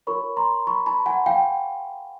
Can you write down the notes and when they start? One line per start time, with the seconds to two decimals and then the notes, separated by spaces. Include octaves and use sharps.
0.07 F4 A#4 C#5 B5 C#6
0.37 A#5 C6
0.67 B5 C#6
0.86 A5 B5
1.06 F#5 G#5
1.26 F5 G5